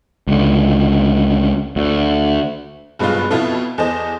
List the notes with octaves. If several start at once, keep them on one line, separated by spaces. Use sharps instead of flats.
C#2 D3
D2
F#1 G2 B2 G#3 B3 F4
F2 B2 B3 E4 F4 A4
E2 A4 C5 D#5 E7